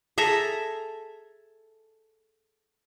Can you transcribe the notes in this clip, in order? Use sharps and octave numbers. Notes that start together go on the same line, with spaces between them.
G#4 A4 E5 A#5